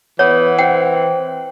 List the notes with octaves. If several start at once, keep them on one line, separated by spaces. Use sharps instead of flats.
E3 B3 C#5
C4 F#5 G5